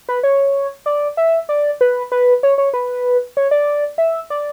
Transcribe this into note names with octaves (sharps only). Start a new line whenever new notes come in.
B4
C#5
D5
E5
D5
B4
B4
C#5
C#5
B4
C#5
D5
E5
D5